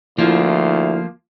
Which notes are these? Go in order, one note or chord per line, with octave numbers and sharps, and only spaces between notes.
D2 F3 A#3 E4 F4